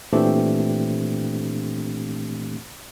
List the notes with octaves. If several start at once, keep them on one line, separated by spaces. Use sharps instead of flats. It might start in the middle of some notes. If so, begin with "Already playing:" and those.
A#2 E3 A3 C4 D4 G4